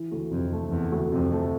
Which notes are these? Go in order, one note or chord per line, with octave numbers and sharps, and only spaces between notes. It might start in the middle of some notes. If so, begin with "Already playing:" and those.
Already playing: E3
D2
F2 C3
A3
E2 E3
D2
F2 C3
A3